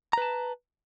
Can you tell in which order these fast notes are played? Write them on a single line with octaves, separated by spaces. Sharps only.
A#5 B4 A5